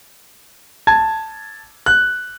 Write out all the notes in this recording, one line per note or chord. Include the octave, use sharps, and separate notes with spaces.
A5 G#6
F#6